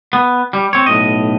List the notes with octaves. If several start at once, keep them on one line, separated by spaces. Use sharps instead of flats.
B3
G3
C4 C#5
B1 A2 D#5